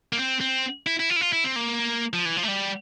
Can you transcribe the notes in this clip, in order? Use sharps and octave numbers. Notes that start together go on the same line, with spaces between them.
A#3
C4
C4
E4
E4
F4
E4
F4
E4
C4
A#3
F3
E3
F3
A3
G3